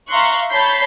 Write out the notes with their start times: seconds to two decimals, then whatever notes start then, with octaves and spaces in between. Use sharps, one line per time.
0.10 E5 F5 A#5 C6 C#6 F#6
0.51 C#5 A5 B5 G6 B6 C7